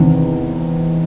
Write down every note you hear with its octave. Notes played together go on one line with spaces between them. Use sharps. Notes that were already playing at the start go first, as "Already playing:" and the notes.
Already playing: E2 C3 D#3